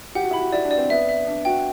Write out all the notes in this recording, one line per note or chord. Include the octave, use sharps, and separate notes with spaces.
G4 F#5
F#4
E4 B5
F#4
E4 D5
D4
D5
C4
B3 E5
E5
D4 E5
F#4 G5